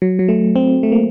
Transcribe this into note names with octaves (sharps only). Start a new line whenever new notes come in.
F#3
F#3
A3
C4
A3
A#3